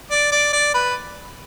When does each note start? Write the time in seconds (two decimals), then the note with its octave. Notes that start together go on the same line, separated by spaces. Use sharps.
0.11 D5
0.32 D5
0.53 D5
0.74 B4